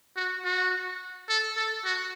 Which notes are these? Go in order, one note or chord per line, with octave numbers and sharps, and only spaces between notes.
F#4
F#4
A4
A4
F#4